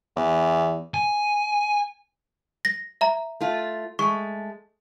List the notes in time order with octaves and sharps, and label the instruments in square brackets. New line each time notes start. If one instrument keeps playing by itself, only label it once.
[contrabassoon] E2
[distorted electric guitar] G#5
[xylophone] A#6
E5 A#5
[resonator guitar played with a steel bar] A3 F4
[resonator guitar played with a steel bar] G#3 A3 [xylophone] C#6